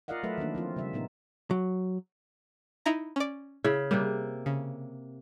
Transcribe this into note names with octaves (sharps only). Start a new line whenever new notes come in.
F4 A#4 D5 D#5 F5 F#5
F#3 A3 A4 B4 E5
D#3 E3 A#3 D4
F3 C4 F4
C#3 G3 E5
A#2 B3 D#4 A#4
F#3
D#4 E4 A#5
C#4 D5
C#3 E4
C3 G3 A#3
C#3